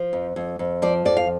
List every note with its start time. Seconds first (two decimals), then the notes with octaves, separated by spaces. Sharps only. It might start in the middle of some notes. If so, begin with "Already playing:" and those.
Already playing: F3
0.13 F2
0.36 F2
0.59 F2
0.82 F3 D5
1.05 F2 D5
1.17 F5